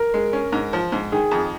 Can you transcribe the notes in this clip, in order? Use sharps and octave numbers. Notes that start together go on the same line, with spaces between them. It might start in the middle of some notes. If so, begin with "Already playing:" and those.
Already playing: A#4
G#3
C#4
G#2
F3
G#2
D#3 G#4
F2